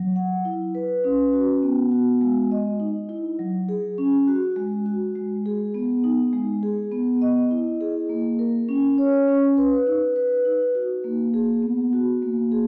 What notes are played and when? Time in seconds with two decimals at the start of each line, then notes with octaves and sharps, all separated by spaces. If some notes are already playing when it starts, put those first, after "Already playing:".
Already playing: F#3
0.16 F#5
0.45 E4
0.75 B4
1.04 C#4
1.33 F#4
1.63 B3
1.91 F#4
2.21 G#3
2.51 D#5
2.80 D#4
3.09 E4
3.39 F#3
3.69 G#4
3.98 C#4
4.27 F#4
4.56 G#3
4.86 F#4
5.15 G#3
5.46 G#4
5.74 B3
6.04 D#4
6.33 G#3
6.63 G#4
6.92 B3
7.22 D#5
7.51 E4
7.81 G#4
8.09 A#3
8.39 A#4
8.69 C#4
8.98 C#5
9.28 C#4
9.57 B4
9.87 D#4
10.16 B4
10.45 D#4
10.75 F#4
11.04 A#3
11.34 G#4
11.63 B3
11.93 F#4
12.22 A#3
12.52 G#4